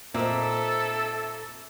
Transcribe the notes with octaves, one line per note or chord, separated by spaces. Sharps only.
A#2 C4 D#4 A4 E5